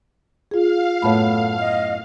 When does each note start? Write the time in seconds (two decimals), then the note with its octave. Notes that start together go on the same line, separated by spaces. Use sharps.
0.51 F4 G#4 F5
1.02 F#2 A2 A3 B3 C#5 A5 B5
1.59 D#5